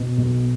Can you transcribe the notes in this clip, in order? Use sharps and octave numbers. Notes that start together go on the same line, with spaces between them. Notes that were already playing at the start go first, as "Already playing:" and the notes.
Already playing: B2
B1